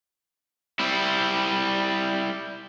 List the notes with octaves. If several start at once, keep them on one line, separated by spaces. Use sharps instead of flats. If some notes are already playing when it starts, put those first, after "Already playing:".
G3 E4